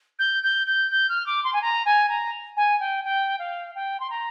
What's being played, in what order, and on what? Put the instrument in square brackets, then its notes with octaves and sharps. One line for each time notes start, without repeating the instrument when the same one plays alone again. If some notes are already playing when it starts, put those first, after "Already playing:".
[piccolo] G6
G6
G6
G6
F6
D6
C6
G#5
A#5
G#5
A#5
G#5
G5
G5
F5
G5
C6
A#5